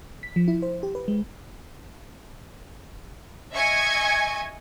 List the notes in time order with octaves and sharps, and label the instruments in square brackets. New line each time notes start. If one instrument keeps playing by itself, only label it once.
[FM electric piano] B6
F3
E4
C5
G4
B4
G#3
[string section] D#5 E5 G#5 C#6 G#6